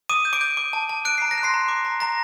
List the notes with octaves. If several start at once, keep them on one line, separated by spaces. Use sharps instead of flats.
D6 D#6 D#7
G6
D6 D7
G6
D6
A5
A5
F#6 D7
A#5 C7
A#6
F#6
C6 C7
A#5
D6
A#5
A#5 A#6